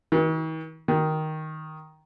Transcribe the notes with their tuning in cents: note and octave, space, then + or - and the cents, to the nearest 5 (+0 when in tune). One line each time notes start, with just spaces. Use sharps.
D#3 +45
D#3 +5